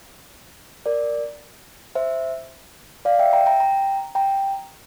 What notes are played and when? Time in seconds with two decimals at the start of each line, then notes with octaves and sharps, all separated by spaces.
0.86 A#4 D5
1.95 C5 E5
3.05 D5 F5
3.19 E5 G5
3.33 G5 A#5
3.46 G5 A#5
3.60 G5 A#5
4.15 G5 A#5